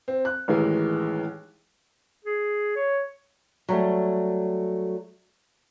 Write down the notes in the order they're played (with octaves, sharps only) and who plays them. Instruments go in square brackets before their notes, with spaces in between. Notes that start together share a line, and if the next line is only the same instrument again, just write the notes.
[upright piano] C4
F#6
A1 D#3 E3 G#3
[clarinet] G#4
C#5
[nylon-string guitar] F#3 G3 A3